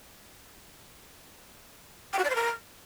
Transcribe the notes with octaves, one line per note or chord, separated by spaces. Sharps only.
G5
F#4
D5
C5
A#4